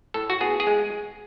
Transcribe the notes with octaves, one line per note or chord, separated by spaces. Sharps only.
A2 A4
F#4
B3 G#4
G#4
G#3